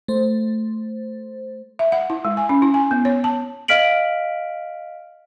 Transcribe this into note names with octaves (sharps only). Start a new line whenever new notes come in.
A3 C5
E5
F#5
E4
G#3
G#5
C#4
E4
G#5
B3
C#5
A5
D#5 F5 F6 B6 D7 F#7